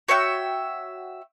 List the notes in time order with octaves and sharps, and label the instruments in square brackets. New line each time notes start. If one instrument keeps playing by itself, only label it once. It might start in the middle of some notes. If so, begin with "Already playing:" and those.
[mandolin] F#4 C#5 E5 G5